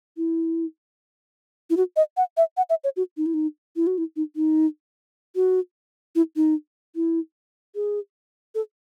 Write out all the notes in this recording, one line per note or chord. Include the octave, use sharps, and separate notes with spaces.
E4
E4
F#4
D#5
F#5
E5
F#5
E5
C#5
F#4
D#4
E4
D#4
E4
F#4
E4
D#4
D#4
F#4
E4
D#4
E4
G#4
A4